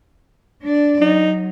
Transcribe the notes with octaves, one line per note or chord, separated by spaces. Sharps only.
D4 D5
F#3 D#4